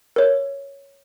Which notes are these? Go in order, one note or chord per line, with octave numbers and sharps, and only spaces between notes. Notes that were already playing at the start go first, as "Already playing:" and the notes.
A#4 C#5